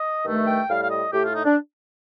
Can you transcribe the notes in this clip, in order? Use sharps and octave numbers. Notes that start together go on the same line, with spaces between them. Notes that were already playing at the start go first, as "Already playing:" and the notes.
Already playing: D#5
G2 D#3 A3
G5
A2 G3 F5
F5
D#5
A2 A3 G4
F4
D#4
D4